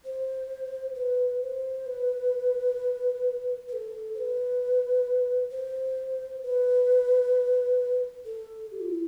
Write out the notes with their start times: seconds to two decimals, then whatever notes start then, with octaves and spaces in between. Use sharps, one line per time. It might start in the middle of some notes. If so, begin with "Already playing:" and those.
0.05 C5
0.95 B4
1.42 C5
1.86 B4
3.69 B4
3.73 A4
4.15 C5
4.18 B4
5.51 C5
6.43 B4
8.25 A4
8.71 G4
8.80 F4
8.89 E4